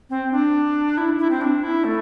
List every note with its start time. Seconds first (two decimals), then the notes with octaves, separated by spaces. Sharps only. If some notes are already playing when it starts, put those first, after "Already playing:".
0.10 C4
0.32 D4
0.98 E4
1.19 E4
1.30 C4
1.41 D4
1.63 E4
1.84 A3